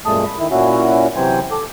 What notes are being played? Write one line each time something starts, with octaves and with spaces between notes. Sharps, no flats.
F#2 A#2 G#3 A3 A5 D#6
B5
D#3 E4
A#2 C#4 E4 F#4
C3 E3 F#3 C5 G5 G#5
A4 D6